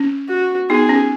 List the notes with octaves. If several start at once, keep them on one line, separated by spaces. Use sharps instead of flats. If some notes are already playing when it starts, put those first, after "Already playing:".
Already playing: C#4
F#4
B3 D#4 G#4
C#4